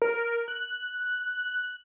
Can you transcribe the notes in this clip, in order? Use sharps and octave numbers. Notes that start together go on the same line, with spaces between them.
A#4
F#6